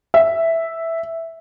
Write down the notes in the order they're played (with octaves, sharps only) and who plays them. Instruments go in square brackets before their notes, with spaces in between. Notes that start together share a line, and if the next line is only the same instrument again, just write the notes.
[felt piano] E5